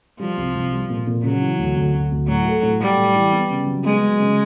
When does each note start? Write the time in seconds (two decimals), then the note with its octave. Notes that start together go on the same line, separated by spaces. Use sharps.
0.20 F3 G3
0.37 C2
0.55 C2
0.72 G3
0.90 A#2
1.07 A#2
1.23 C#3 F#3
1.42 E3
1.58 D2
1.76 D2
1.94 D2
2.11 D2
2.28 A2 F#3
2.45 A3
2.63 A2
2.81 G3 A3
2.97 A2
3.16 E3
3.32 B3
3.50 C#3
3.67 F#3
3.84 G#3 B3
4.02 F#3
4.19 C#3